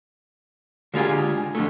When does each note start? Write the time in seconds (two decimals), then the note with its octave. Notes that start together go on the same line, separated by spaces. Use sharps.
0.94 D3 G#3 F4 G4 G#4
1.55 F2 D3 A3